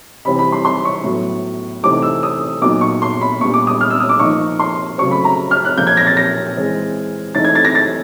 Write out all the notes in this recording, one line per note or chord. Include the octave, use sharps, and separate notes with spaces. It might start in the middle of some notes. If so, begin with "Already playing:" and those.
C3 E3 G3 C4 B5
B5
C6
C6
C#6
A2 F#3 B3
C3 E3 A3 C4 D#4 D6
E6
D#6
A#2 F#3 B3 D#4 D6
C#6
C6
B5
A#2 G3 B3 D4 C#6
D6
D#6
F6
E6
D#6
D6
F3 A#3 D#4 C#6
C6
C#3 F#3 A3 C4 C#6
B5
A#5
F6
F#6
A#2 F3 A#3 G6
G#6
A#6
A6
A#6
E3 G#3 C4
E3 A3 C4 D#4 A6
G#6
A6
A#6
A6